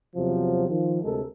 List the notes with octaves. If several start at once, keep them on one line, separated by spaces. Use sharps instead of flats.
E2 C3 F3 F#3
D#3 F3
D2 C3 G#3 A4 A#4